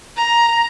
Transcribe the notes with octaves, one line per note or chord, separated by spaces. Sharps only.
A#5